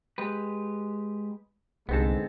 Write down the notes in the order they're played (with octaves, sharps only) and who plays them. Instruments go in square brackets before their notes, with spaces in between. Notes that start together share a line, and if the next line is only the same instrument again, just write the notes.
[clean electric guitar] G#3 G4 B4
[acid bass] C2 [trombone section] G#2 D3 G#3 [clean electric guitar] B3 C4 A4